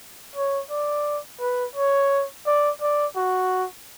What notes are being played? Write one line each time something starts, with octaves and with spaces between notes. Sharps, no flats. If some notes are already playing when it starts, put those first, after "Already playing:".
C#5
D5
B4
C#5
D5
D5
F#4